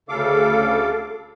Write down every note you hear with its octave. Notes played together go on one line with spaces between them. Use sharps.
D2 C#3 A4 F5 D6